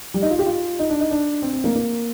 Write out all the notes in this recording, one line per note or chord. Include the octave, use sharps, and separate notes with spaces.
G3
D#4
F4
G4
F4
D#4
D4
D#4
D4
C4
C4
A#3
A#3